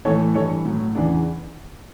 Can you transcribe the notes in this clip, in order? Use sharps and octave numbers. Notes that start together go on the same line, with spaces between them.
A2 E3 A4 C#5
G2 E3 A4 C#5
A2 F#3
E2 C#3 E3 D4